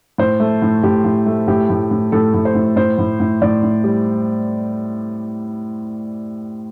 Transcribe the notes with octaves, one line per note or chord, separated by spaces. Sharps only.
A2 C5
A3
A2
A2 G4
A2
A3
A2 G4
A2
A2
A2 A4
A2
C5
A2
A2 C5
A2
A2
A2 D5
A2
G3